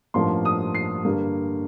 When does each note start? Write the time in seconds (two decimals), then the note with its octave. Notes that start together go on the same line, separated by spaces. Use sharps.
0.14 A1 G2 F3 A#3 C6
0.45 D#6
0.75 C7
1.05 G2 D3 G3 A#3